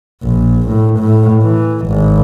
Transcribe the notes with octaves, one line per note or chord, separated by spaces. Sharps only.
A#1
A2
A2
E3
G#1